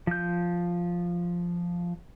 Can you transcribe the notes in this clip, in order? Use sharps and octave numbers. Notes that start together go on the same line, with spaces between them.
F3 G6